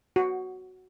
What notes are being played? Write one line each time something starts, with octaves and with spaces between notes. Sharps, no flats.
F#4